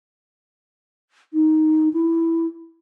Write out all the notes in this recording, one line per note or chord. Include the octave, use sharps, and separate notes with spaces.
D#4
E4